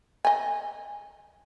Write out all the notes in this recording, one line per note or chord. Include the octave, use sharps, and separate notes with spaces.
D#5 G#5